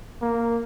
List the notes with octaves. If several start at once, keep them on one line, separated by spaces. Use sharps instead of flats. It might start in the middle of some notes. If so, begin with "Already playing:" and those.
A#3